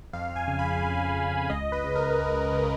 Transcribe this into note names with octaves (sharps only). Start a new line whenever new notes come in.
F2 F5
G#5
C#3
B5
F2
C#3
C#2 D#5
B4
C#3
A#4
C#2
C#3